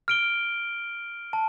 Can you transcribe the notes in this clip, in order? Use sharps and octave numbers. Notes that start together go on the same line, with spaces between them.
F6 D7 G7
A5